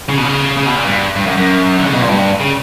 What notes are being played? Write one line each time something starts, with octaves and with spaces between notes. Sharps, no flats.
C#3
B2
C#3
C#3
B2
A#2
G2
G2
F#2
F#2
D3
C#3
B2
A#2
G2
C#3